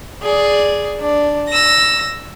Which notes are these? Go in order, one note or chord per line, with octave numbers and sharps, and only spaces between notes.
G#4 D5
D4
E6 A#6